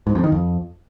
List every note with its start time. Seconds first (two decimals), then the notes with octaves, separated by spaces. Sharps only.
0.07 G#2
0.15 F2
0.24 D#3
0.32 F2